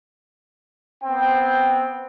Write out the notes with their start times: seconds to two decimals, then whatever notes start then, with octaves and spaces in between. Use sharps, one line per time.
1.04 B3 C4 G5